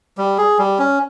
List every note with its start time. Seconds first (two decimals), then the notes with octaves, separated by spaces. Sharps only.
0.18 G3
0.38 G#4
0.59 G3
0.79 C#4